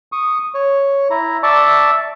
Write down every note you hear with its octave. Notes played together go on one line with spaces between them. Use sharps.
C#6 D#6
C#5
E4 A#5
D5 E5 A5 C#6